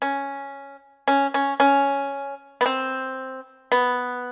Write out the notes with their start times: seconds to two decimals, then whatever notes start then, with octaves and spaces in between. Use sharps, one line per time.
0.02 C#4
1.08 C#4
1.34 C#4
1.60 C#4
2.61 B3
2.66 C4
3.72 B3